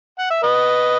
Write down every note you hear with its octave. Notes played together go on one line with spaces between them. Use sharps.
F#5
E5
B4 D#5